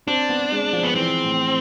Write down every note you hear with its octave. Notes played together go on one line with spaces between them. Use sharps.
C4 D4
B3
G#3
F3
B3
E3 C4
A2